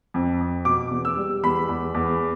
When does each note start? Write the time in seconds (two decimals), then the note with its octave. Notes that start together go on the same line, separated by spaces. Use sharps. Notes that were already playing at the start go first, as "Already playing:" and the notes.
0.14 F2
0.41 F2
0.65 B2 D6
0.91 E2
1.05 E6
1.17 G3
1.44 E2 B5
1.69 E2
1.94 E2